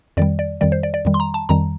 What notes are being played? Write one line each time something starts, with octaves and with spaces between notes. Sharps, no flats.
F2 D#3 G3 D5
D5
F2 D#3 G3 D5
C5
D5
D5
F2 D#3 G3
C6
A#5
A5
F2 D#3 G3 A#5